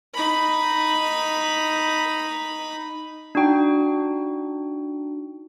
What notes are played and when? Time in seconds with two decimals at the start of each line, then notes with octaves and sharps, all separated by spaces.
0.15 D#4 B5
3.35 D4 D#4 F#4 G5